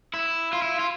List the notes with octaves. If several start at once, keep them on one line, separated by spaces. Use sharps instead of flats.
E4
F4
E4
F4